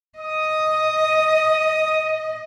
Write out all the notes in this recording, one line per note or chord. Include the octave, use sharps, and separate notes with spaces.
D#5 D#6